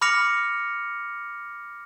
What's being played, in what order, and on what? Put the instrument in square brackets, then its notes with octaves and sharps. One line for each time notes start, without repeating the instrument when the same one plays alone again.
[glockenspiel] B5 D6 F6 A#6 C#7 F7